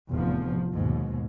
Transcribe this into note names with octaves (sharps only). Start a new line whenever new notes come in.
F1 E2 A2 F3
D#2 G#2 B2